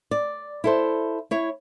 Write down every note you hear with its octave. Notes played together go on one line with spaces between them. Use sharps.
D5
E4 A4 C5
E4 C#5